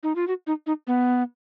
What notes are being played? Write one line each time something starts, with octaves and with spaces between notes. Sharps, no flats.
D#4
F4
F#4
D#4
D#4
B3